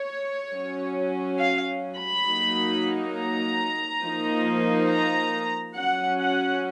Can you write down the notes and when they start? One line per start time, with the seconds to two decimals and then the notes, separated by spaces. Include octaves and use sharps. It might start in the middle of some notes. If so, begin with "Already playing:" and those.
Already playing: C#5
0.53 F#3 C#4
1.40 F5
1.98 B5
2.27 F#3 A#3 D#4
3.15 A#5
4.02 F3 A#3 D#4
4.89 A#5
5.76 F#3 C#4 F#5
6.20 F#5